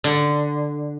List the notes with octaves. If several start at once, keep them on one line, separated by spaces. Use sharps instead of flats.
D3